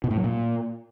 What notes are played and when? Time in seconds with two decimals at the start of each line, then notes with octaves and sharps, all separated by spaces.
0.04 B2
0.11 A2
0.17 F#3
0.24 A#2